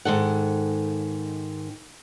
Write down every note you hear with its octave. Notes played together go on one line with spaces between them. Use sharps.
G#2 D#3 A4 F#5